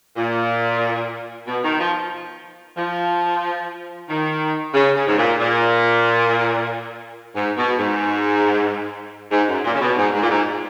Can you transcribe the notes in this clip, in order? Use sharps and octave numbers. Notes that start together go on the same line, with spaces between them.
A#2
B2
D#3
F3
F3
D#3
C#3
C#3
G#2
A#2
A#2
G#2
B2
G#2
G#2
F#2
A#2
C#3
B2
G#2
G#2
A#2
G#2